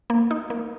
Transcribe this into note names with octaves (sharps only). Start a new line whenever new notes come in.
A#3
D#4
A#3